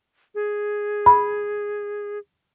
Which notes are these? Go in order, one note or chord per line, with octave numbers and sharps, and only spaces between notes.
G#4
B5